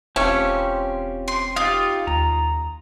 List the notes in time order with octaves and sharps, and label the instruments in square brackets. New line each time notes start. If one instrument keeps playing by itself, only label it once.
[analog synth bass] E1 [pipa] A3 C#4 [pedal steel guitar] C4 F4 G4
[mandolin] C6
[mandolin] D#4 F4 [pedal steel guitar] G4 F5
[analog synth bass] D#2 [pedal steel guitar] A#5